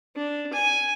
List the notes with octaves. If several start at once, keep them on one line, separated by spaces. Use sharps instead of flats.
D4
G#5